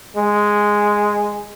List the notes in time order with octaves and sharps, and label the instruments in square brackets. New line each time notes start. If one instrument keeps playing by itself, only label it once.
[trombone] G#3